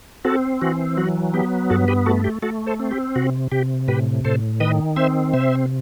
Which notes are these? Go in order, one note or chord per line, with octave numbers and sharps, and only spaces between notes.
C4 F#4 A4
E3 F#4
F#3 F#4
B3 G4
G2 F#4 A4
G4 B4
A3 F#4 A4
G4
A3 F#4 A4
A4 C5
C4
G4
C3 F#4
C3 G4
A2 G4 B4
A2 A4 C5
D#3 B4 D#5
C4 C5 E5
C3 C5 E5